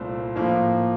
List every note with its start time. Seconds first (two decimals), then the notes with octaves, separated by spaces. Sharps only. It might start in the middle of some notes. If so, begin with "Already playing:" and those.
Already playing: C2 A#2 A3 C4 F4
0.36 A2 F3 A#3